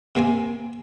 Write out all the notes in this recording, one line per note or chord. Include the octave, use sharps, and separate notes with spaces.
C3 A#3 C4 G#5